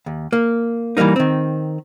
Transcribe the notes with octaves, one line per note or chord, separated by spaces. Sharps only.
D#2
A#3
E3 G3 G#3 A#3 D#4
D#3 C4